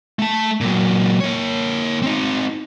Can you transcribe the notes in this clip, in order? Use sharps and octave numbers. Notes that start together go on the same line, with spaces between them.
A3 A5
A#2 F#3
A#3 C#5
C4 D#4